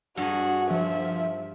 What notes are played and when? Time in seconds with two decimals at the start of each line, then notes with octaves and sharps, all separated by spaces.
0.17 G2 F#4 G#4
0.71 F3 E5